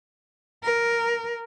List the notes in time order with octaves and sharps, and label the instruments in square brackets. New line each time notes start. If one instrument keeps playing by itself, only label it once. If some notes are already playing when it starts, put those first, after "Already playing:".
[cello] A#4